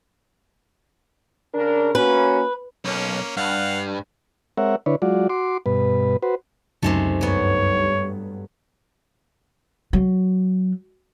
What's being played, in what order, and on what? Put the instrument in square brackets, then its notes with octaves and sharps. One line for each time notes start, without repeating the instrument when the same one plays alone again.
[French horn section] C#3 D4 A#4
[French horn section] A#3 C#4 F#4 [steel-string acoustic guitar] B4
[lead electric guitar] B1 [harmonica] A#3 C#4
[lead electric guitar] G2 [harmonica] F5 F#5
[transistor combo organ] G#3 C4 A#4 C#5 E5 F#5
D3 D4 E4 B4 C#5
F#3 G#3 F4 F#4 D5
F#4 C6 D6
G2 B2 B4
F#4 B4 C5
[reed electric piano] C#2 F#2 D#4 [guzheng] C3 G#3 A3
[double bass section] G2 [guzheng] F#3 B3 [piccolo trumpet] C#5
[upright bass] F#3